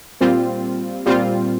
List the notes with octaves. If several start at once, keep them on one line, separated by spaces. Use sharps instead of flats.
A#2 G3 C4 F4
A#2 G3 C4 F4